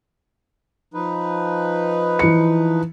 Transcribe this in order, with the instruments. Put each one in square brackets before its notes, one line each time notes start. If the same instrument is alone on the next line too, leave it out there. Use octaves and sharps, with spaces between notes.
[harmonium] F3 D#4 B4
[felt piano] E3 C#7